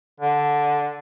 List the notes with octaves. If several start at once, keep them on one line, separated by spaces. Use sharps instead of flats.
D3